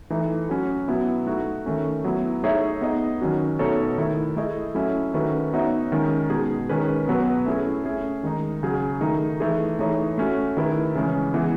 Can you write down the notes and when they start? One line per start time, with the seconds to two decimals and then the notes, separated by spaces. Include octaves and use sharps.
0.10 E3 A3 D#4 A4
0.49 F#3 C#4 F#4
0.88 B2 F#3 B3 E4
1.27 A3 D#4 F#4
1.66 D#3 A3 C#4
2.04 F#3 B3 E4
2.43 A3 D#4 G#4 C#5 E5
2.81 B3 D#4 G#4 D#5
3.21 D#3 F#3 C#4 F#4
3.59 B2 A3 D#4 A4 C#5
3.98 D#3 A3 E4
4.37 A3 E4 G#4 D#5
4.75 F#3 A3 C#4 E4 A4
5.14 D#3 A3 C#4 F#4 B4
5.53 B3 D#4 F#4 C#5 E5
5.92 D#3 G#3 C#4
6.30 B2 G#3 D#4 G#4
6.69 D#3 G#3 C#4 G#4 B4
7.08 B2 F#3 B3 F#4 B4
7.46 A3 C#4 E4 G#4
7.84 A3 C#4 G#4
8.24 D#3 G#3 D#4
8.63 C#3 F#3 C#4 G#4
9.01 D#3 A3 D#4 G#4
9.40 E3 A3 D#4 G#4 B4
9.79 E3 A3 D#4 G#4 C#5
10.18 A3 C#4 F#4
10.57 D#3 A3 E4 G#4 B4
10.95 C#3 E3 G#3 C#4
11.34 E3 G#3 B3 E4 G#4